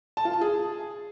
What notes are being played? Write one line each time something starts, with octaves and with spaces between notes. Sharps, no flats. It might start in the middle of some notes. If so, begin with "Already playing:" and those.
A5
F4
A5
G#4